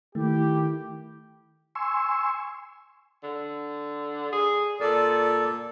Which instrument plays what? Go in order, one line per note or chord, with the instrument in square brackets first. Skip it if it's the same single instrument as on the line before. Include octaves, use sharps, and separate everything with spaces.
[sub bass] D#3 [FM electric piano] A3 [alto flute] E4 [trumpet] G4
[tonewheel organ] G#5 C6 C#6 E6
[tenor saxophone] D3
G#4
[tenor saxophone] A#2 [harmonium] A4 D5